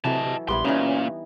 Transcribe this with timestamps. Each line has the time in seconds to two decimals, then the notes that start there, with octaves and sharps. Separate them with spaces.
0.05 C3 E3 F#3 A4 D#5 A5
0.48 A#1 G3 B3 E4 C6
0.65 A#2 E3 C#4 D#4